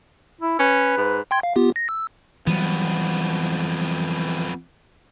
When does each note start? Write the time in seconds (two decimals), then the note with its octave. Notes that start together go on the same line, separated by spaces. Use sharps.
0.41 E4
0.59 C#4 B4
0.97 G#2
1.31 G5 C6 G#6
1.43 F5
1.56 B3 F4 G4
1.76 A#6
1.89 E6
2.47 F2 E3 F#3 G3 B3